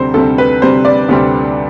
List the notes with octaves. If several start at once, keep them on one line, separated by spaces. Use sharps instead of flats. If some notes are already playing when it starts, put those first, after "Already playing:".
Already playing: D2 C3 G3 C4 C5
D2 C3 G3 C4 A4
B4
D2 C3 G3 C4 C5
D5
D2 C3 G3 C4